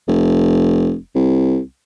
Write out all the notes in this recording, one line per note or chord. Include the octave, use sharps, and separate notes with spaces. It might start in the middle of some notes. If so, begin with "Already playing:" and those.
F1
C2